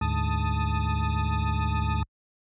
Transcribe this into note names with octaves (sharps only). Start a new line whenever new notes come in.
D2 G#2 A5 D#6